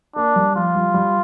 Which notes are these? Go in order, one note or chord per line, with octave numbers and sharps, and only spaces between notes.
A#3 D4
G3
F3 F4
G3
G3